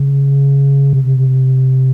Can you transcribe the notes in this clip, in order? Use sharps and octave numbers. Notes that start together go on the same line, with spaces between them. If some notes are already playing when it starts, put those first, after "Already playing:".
Already playing: C#3
C3